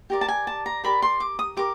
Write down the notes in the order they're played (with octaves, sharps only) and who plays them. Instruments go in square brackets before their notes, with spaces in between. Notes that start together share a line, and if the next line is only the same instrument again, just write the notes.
[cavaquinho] G4 A#4 D5
A5
G#5
A5
A#5
G4 A#4 D5 B5
C6
D6
D#6
G4 A#4 D6